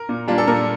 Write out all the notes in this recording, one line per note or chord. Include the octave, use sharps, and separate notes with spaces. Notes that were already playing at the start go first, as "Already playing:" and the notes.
Already playing: A#4
A#2
G3 A#3 D4 F4
A4
A#2 A#4